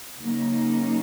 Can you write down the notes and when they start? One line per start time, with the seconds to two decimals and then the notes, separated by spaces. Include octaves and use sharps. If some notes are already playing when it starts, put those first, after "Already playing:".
0.20 C#3 F#3 A#3 D#4